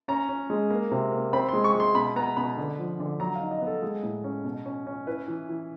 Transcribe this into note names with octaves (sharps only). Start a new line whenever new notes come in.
C#4 A#5
C#4
G#3
A#3
C3
A#3
C4 B5
G#3 C6
C#6
G#3
C6
B2 B5
B3 A#5
B2 B5
D3
F3
D3
F#3 A#5
F5
D#4
D#5
B3
A4
G#3
A2
C#4
B2
C#4
C#4
E4 B4
E3
E3